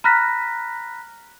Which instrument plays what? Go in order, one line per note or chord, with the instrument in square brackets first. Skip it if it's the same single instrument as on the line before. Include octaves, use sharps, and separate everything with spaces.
[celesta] A#5 B5 F6 F#6 A#6 B6